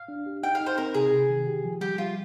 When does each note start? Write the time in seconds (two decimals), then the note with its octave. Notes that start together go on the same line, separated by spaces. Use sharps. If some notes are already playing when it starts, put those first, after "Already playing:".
Already playing: F5
0.08 D4
0.26 G4
0.43 D#4 G5
0.55 F5
0.61 D#4
0.66 C5
0.78 C4 A#4
0.95 C3 G#4
1.12 C3
1.30 D#3
1.47 G4
1.64 F3
1.81 G3 G4
1.98 G3 F4